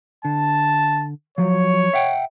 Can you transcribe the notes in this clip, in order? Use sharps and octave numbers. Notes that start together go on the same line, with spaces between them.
D3 A5
F3 F#3 C#5
E5 F#5 G5